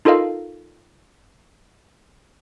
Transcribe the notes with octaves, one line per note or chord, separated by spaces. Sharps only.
D#4 F4 A4 A#4 D#5 F5